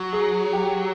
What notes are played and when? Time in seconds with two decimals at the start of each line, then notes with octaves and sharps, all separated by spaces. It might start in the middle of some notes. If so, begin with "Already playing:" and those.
Already playing: F#3
0.13 G#4
0.53 G4